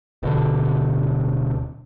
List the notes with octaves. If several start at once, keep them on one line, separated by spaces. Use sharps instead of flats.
D1 B2 D3